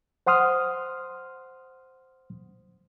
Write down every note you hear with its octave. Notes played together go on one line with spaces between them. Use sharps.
C5 F#5 C6 D#6 F6